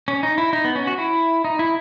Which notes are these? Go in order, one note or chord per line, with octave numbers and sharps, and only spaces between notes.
C#4
D#4
E4
D#4
B3
C#4
F#4
E4
D#4
E4